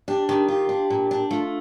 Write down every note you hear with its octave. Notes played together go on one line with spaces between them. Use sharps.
D4 G4
D#3 G4
F4 G4
D4
A#2
D4
A3 F4